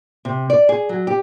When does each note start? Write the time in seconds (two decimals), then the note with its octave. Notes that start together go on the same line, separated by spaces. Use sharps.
0.25 C3
0.50 D5
0.69 G#4
0.89 F#3
1.07 G4